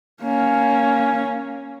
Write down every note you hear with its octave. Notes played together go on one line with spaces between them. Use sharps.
A#3 C#4